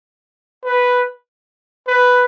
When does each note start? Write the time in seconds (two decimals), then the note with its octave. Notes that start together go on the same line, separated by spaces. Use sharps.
0.64 B4
1.87 B4